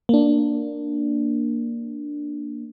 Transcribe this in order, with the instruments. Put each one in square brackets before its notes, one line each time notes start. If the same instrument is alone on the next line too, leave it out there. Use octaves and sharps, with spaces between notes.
[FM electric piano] A#3 D4